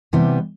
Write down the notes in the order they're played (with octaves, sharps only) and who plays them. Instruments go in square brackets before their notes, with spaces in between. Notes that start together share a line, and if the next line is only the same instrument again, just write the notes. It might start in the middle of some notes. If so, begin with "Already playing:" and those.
[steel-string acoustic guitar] C3 E3 G3 B3